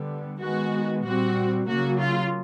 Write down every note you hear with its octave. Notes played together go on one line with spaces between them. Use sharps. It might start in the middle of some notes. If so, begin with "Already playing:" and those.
Already playing: D3 G3 B3
D#3 G#3 B3 F#4
A#2 G3 C4 F#4
C#3 F#3 A#3 F#4
F4